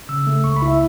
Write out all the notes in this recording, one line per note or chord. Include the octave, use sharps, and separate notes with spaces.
C#3 E6
A3
C#2 C#6
B5
E4
E5